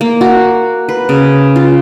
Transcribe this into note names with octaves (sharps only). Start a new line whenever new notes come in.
A#3
F#4
B4
C#3
F4